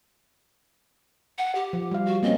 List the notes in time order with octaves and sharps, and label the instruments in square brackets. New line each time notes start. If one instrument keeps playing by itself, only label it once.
[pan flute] F#5
G4
[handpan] F3
G3 F5
[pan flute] F#4
[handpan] A#3 C4 C#4 [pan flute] D#5